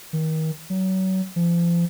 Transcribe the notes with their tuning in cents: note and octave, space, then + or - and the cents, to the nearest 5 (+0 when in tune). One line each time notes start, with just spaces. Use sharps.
D#3 +30
F#3 +30
F3 -35